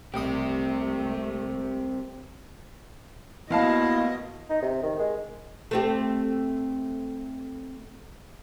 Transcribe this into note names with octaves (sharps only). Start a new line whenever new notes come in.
C2 A3 C4 G4 D#5
D2 A#3 B3 E4 F#4 D#5 F5 A5
D#4
C3
D#3
G#3
A3 C4 G4